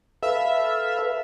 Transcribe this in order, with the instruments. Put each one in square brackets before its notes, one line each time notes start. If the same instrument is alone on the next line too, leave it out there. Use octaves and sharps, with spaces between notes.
[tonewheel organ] A4 B4 F5 [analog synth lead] E5